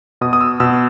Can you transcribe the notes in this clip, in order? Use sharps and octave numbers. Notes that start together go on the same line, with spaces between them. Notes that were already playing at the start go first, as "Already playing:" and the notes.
B2 D#6
D#6
E6
B2 E6